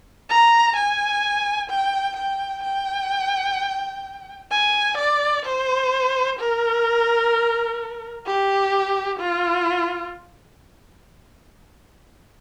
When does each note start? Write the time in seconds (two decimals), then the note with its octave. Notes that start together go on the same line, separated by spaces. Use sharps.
0.30 A#5
0.77 G#5
1.70 G5
2.17 G5
2.63 G5
4.51 G#5
4.98 D5
5.46 C5
6.39 A#4
8.27 G4
9.20 F4